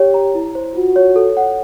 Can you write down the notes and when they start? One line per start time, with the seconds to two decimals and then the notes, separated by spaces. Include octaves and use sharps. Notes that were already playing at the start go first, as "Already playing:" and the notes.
Already playing: G4 C#5
0.14 A#5
0.35 E4
0.55 C5
0.75 F4 F#4
0.96 C#5
1.16 A4
1.37 F#5